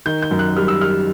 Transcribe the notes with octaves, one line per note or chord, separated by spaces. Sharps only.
D#3 G6
G6
F#2
F#6
G3 F6
E6
G3 F6